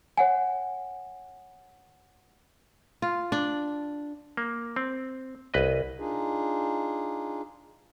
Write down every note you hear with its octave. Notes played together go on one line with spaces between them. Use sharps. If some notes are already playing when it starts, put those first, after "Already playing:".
C#5 F#5 G#5
F4
D4
A#3
C4
C2 B4 D#5
D4 D#4 F4 G#4